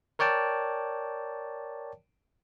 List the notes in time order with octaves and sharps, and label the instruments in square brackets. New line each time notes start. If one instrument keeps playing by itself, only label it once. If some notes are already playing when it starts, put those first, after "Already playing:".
[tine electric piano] A#4 C#5 D5 G5 A5